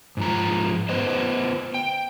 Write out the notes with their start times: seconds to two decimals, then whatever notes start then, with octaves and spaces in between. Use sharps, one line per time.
0.17 G#2 F3 A#5
0.89 B3 B4 C5 D#5
1.74 G5